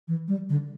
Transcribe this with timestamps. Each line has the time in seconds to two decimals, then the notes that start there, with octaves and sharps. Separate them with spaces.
0.08 E3
0.28 G3
0.49 D3